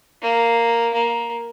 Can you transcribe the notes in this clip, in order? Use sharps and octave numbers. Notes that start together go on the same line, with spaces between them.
A#3
A#3